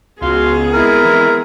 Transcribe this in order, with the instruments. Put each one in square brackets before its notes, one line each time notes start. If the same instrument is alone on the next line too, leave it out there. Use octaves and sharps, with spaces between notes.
[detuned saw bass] C#2 [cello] B3 G#4 [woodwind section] F#4 F5 C6
[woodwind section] G#3 C4 E4 [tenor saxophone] A#4
[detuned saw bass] E3